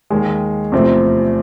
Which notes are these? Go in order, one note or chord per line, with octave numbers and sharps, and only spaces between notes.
D#2 D#3 G#3
E2 C3 F3 A3 C4